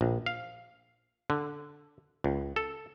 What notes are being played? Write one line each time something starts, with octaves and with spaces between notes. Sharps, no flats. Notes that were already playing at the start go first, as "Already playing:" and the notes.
A#1
F5
D3
C#2
A4